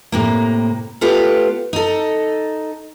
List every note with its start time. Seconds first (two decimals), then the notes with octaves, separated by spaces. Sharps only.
0.12 A2 C3 A#3
1.01 A3 B3 F4 G4 B4
1.73 D#4 A4